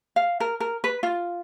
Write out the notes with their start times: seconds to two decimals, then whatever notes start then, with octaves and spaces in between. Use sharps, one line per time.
0.16 F5
0.40 A#4
0.60 A#4
0.84 B4
1.03 F4